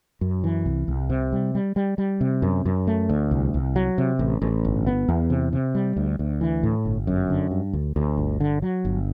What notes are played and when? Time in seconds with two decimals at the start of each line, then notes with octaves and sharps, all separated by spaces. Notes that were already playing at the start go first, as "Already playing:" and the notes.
0.21 F#2
0.44 E3
0.66 C2
0.88 C2
1.10 C3
1.33 G3
1.55 G3
1.76 G3
1.98 G3
2.21 C3
2.42 F#2
2.65 F#2
2.87 A3
3.09 D2
3.31 C2
3.54 C2
3.76 F#3
3.98 C3
4.19 A1
4.42 A1
4.65 G1
4.86 B3
5.08 E2
5.30 C3
5.53 C3
5.75 G3
5.97 D2
6.19 D2
6.41 E3
6.63 A2
6.85 G1
7.07 F#2
7.30 D3
7.51 G2
7.73 D2
7.96 D2
8.17 G1
8.40 D3
8.62 F#3
8.85 G1